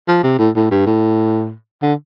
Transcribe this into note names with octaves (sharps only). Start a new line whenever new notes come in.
F3
C3
A2
A2
G2
A2
D3